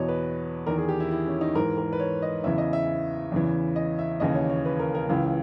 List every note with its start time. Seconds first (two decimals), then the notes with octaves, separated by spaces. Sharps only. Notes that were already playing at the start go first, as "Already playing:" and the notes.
Already playing: E2 B2 C#5 D#5
0.09 B4
0.67 E2 D#3 A#4
0.78 G#4
0.89 G4
1.00 E4
1.11 E4
1.27 C#4
1.41 D#4
1.55 G#2 E3 A#4
1.78 A#4
1.93 B4
2.00 C#5
2.22 D#5
2.44 E2 C#3 E3 E5
2.58 D#5
2.73 E5
3.32 E2 C#3 E3
3.76 D#5
3.99 E5
4.20 D#2 C#3 E3 D#5
4.35 C#5
4.50 C#5
4.65 B4
4.79 A#4
4.95 A#4
5.09 C#2 C#3 E3